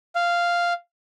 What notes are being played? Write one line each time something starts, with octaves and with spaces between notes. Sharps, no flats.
F5